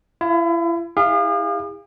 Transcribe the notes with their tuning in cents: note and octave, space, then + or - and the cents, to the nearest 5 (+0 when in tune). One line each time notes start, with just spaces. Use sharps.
E4 +35 F5 +0
E4 -20 G#4 -45 F5 +0